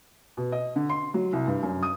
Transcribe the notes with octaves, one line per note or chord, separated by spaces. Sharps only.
B2
D#5
D3
C6
F#3
C2
G2
F#2
D#6